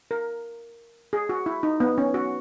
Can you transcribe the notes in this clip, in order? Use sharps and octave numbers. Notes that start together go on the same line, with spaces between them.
A#4
G#4
F#4
E4
D#4
B3
C#4
F#4